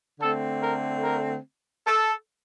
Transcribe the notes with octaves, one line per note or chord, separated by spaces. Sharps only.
D3 A3 C4 A4
A#4
A#4
A4